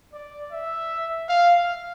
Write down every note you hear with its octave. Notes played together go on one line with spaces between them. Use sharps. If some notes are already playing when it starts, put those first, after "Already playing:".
D5
E5
F5